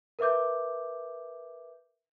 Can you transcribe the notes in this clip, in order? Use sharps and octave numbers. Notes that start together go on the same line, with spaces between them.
A#4 B4 E5 D6 G6